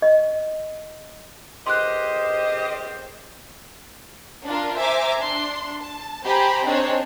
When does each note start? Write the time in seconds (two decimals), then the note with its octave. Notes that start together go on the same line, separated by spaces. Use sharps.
0.02 D#5
1.67 C#2 G4 A#4 C5 D#5 C6 F#6
4.47 D4 F4 A#4
4.78 C5 E5 G#5 A#5 D6
5.18 D4 C6
5.80 A5
6.25 G4 C5 G5 G#5 A#5 B5
6.65 C4 D4 D#4 G#4 C5 C#5